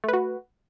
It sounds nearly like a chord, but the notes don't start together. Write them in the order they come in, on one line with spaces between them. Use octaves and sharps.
A3 B4 F#4